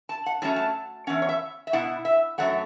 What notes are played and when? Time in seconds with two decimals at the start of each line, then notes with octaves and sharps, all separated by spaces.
0.09 A5
0.26 F#5
0.42 A2 F#3 A3 C#4 A5
0.56 A5
1.07 E2 E3 C#4 F#5
1.22 C#5
1.29 E5
1.67 E5
1.73 B2 B3 E4 F#5
2.05 E5
2.38 F#2 F#3 A3 F#5